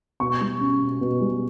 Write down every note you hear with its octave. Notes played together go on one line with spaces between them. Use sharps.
B2 C#6
G3
C#4
B2
B2
G3